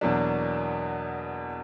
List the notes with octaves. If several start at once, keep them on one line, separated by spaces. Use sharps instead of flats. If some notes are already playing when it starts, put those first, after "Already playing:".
E2 B2 F#3 A#3 D4